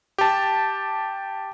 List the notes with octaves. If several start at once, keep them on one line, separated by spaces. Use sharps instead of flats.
G4 A5